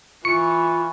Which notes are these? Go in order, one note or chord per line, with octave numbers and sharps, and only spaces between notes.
E3 F4 C#6 C#7